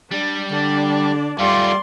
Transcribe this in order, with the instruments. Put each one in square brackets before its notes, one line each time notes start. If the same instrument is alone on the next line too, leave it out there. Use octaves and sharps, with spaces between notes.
[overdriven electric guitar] G3 [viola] D4
[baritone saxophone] D3 [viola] D4 D5
[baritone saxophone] G3 [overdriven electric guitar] A3 F4 [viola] D5 C6